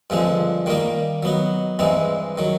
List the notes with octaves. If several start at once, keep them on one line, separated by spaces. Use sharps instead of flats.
G2 D3 F3 G#3 C4
D#3 G3 A#3 D#4
F#3 B3 D#4
G2 E3 G#3 C4 D#4
D#3 F#3